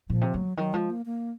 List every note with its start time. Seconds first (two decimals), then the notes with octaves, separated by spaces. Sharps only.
0.09 A#2 F3
0.21 C3
0.34 F#3 A#3
0.45 C#3
0.57 D#3 F#3
0.73 F3 G#3
0.90 A#3
1.06 A#3